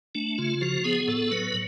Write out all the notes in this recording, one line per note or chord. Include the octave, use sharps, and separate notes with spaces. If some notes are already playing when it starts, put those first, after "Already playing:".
A3 D4
C#3 F4
F3 F#4
B3 G#4
A2 A4
F#3 B4